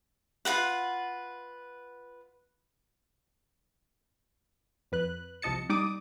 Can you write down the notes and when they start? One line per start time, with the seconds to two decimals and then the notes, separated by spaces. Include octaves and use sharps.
0.45 F4 F#4 B4 F#5
4.92 F2 B4 F#6
5.42 C2 C3 F3 D#5 A5 C#7
5.69 G3 D#4 D5 D6 D#6